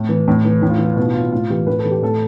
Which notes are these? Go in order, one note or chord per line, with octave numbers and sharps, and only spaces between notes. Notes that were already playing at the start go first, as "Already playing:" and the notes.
Already playing: A2
E3
A2
E3
A2 E4
F4
E3 E4
F4
E4
B2 F4
E4
F4
E4
A2 F4
E3 G4
A2 B4
A4
E3
G4
A2 A4